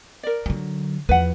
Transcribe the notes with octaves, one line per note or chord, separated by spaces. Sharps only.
A#4 D5
D3 F#3
E2 F3 B4 F#5